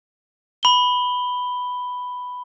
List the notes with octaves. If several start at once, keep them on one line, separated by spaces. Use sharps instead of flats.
B5 G7